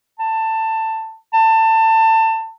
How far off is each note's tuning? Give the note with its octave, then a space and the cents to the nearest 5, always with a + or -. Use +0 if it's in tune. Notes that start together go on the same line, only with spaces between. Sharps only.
A5 +15
A5 +25